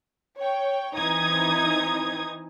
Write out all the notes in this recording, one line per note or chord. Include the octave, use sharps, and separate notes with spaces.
C#5 G5
E3 C4 D#4 D#6 G#6